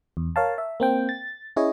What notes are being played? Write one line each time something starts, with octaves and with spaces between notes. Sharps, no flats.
E2
A#4 C#5 F5 A5
E5
A#3 C4 G5
A6
C#4 E4 G#4 C#5 D#5